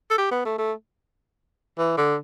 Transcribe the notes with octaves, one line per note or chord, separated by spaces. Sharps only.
A4
G4
B3
A3
A3
E3
D3